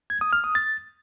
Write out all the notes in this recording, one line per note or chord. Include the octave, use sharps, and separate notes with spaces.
G#6
D#6
F6
D#6
A6